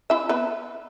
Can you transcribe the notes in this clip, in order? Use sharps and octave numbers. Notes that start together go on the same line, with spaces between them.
E4 E5
B3 B4